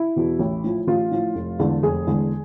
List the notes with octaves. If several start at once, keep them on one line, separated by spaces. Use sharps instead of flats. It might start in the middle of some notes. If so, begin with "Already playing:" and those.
Already playing: E4
E2 B2
A1
A2 F3
A1 F4
A2 F3
F1
E2 D3 G#3
F1 G#4
E2 D3 G#3